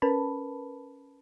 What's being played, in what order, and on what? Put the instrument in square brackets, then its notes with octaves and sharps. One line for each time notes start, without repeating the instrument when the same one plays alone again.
[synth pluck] C#4 A#4 B4 A5 B5